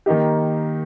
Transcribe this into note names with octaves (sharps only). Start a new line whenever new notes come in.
D#3 A#3 D#4 G4